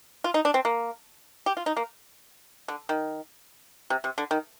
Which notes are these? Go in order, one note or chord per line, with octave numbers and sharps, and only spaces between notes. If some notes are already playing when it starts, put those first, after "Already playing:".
F4
D#4
D4
C4
A#3
G4
F4
D#4
A#3
D3
D#3
C3
C3
D3
D#3